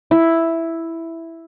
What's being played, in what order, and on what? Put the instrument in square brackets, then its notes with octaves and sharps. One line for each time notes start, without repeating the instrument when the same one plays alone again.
[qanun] E4